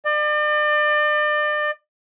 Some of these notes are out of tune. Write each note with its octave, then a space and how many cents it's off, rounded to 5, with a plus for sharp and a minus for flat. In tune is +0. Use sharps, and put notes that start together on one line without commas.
D5 +35